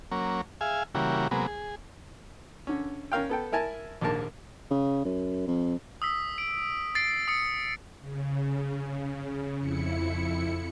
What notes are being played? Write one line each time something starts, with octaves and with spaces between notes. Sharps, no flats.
F#3 A#3 C#4
G#4 E5 F5 G#5
C#3 E3 G3 A#3 F#4
C3 F#3 G#3 A#3 B3
G#4
D3 C#4
C#4 A#4 F5 G5
B3 A4 G5
E4 A#4 G#5 A5
A#1 D#2 G#2 A#3 A#4 A5
C#3
F#2
F2
D#6 E6 B6
D7
D#6 A6 C7 D7
D#6 C#7
C#3
F2 E4 C#7